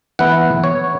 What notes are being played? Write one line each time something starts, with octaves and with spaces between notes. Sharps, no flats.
E3 B3 E4 F#5
C#5